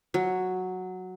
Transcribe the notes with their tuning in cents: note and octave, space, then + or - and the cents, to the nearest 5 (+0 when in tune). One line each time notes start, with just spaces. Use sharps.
F#3 -5